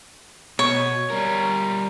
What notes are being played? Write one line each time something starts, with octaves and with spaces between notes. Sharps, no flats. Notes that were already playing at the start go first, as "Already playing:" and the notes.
B2 C#5
G3 A#4